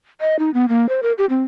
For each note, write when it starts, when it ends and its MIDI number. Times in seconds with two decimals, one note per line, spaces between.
0.21 0.39 75
0.39 0.50 63
0.54 0.66 59
0.69 0.88 58
0.89 1.01 72
1.03 1.12 70
1.18 1.25 67
1.30 1.44 60